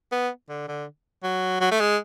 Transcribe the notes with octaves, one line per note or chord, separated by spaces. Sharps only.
B3
D3
D3
F#3
F#3
A3
G#3